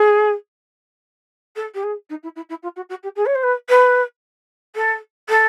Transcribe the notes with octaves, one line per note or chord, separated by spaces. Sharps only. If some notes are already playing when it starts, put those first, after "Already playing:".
Already playing: G#4
A4
G4
G#4
D#4
E4
E4
E4
F4
F#4
F#4
G4
G#4
C#5
C5
B4
B4
A4
A4